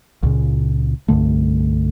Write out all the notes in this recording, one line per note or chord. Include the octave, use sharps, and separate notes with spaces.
C#2 A#2 C#3
C2 G2 D3 A3